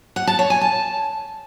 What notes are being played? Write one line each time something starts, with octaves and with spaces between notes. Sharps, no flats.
F#5
A5
C#5
G#5
A5